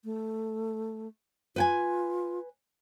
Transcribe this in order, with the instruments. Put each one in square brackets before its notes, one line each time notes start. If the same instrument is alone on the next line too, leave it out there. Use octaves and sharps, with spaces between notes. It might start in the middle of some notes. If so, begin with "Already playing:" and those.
[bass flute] A3
[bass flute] F4 [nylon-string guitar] B4 G5 G#5